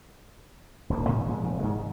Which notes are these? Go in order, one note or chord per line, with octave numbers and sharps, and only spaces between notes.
D#1 D2 G3 A#3
G#2 B2 F3
A#2 F3 G#3
F1 D#3
G#2 D#3 G#3